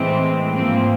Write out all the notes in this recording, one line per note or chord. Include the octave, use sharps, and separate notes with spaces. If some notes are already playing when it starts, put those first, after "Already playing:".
Already playing: A2 E3 G#3 C4
G#2 F3 A#3 C4